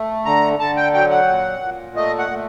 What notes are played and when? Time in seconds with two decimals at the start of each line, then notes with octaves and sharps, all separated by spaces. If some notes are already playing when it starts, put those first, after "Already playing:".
Already playing: A3
0.25 D3 A#5
0.59 D3 A5
0.77 G5
0.94 F#3 G5
1.10 F#5
1.28 A#2
1.62 A#2
1.96 A3 D#5
2.19 F#5
2.31 A3